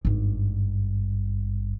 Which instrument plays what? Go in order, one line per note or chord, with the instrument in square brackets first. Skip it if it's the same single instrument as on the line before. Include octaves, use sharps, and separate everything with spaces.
[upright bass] G#1 G2